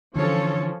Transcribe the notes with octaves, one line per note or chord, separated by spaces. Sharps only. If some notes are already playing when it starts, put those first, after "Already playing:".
D3 E3 F3 C#4 A4 C#5